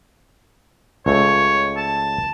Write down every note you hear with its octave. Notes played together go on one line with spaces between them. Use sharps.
C#2 A3 C#5
A5